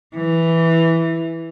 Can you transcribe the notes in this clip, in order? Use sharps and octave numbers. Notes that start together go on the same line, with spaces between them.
E3